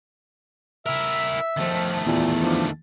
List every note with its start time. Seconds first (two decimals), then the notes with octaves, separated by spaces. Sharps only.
0.86 E4 A#4 E5
1.58 D#3 F3 A3
2.06 E2 A#2
2.41 F3 D4